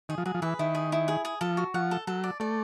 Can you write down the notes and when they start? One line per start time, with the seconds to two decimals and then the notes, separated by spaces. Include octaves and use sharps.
0.09 D#3 G#4
0.18 F3
0.26 F#3 G#4
0.34 F3
0.42 E3 B4
0.59 D#3 E4
0.75 G#4
0.92 E4
1.08 G#4
1.25 G#4
1.41 F3 A4
1.57 F#4
1.74 F3 F#5
1.91 A4
2.07 F#3 A4
2.24 D5
2.40 A3 D5